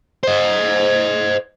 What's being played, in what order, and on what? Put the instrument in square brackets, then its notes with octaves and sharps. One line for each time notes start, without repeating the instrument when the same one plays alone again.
[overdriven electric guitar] C5 D#5